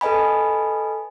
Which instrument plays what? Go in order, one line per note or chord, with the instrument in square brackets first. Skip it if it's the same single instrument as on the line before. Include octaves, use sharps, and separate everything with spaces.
[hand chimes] A4 B4 D#5 G#5 B5